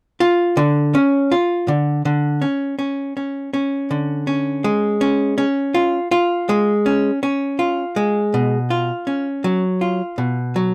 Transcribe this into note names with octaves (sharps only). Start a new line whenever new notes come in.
F4
D3
C#4
F4
D3
D3
C#4
C#4
C#4
C#4
D3
C#4
G#3
C#4
C#4
F4
F4
G#3
C#4
C#4
F4
G#3
B2
F4
C#4
F#3
F4
B2
F#3